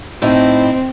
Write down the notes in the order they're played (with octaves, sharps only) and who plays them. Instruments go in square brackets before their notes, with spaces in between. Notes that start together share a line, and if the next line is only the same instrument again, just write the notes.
[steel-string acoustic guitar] A2 D#4 E4 [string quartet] C4